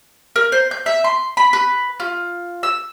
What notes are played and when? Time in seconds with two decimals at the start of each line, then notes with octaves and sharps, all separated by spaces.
0.36 A#4
0.52 C5
0.71 G6
0.86 E5
1.04 C6
1.37 B5
1.53 B4
2.00 F4
2.63 E6